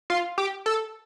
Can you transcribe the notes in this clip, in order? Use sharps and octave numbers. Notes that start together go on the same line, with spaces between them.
F4
G4
A4